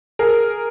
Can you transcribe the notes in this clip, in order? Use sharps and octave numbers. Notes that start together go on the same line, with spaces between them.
G#4 A#4